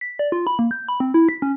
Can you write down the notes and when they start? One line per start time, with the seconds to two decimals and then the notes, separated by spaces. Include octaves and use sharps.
0.01 B6
0.19 D5
0.32 F4
0.47 B5
0.59 A#3
0.71 G6
0.89 B5
1.00 C4
1.14 E4
1.29 B6
1.42 C#4